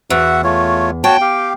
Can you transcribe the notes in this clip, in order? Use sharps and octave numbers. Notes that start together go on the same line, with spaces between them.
E2 F#4 E5 F#5
A3 F4 C#5
F#4 C#5 G5 A5
G4 F5